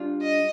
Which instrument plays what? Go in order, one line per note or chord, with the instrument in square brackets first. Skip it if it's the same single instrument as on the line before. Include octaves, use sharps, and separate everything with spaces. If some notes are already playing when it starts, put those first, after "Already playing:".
Already playing: [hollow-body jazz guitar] G3 D4 F4
[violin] D#5